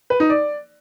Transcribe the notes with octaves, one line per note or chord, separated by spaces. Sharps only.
B4
D#4
D5